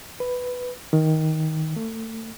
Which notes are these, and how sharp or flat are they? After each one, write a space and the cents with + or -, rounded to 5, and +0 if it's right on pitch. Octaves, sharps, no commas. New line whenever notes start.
B4 +5
D#3 +15
A3 +30